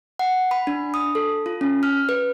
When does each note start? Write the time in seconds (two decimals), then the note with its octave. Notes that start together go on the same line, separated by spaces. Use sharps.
0.19 F#5
0.51 B5
0.67 D4
0.94 D#6
1.15 A4
1.46 F4
1.61 C#4
1.83 F6
2.09 B4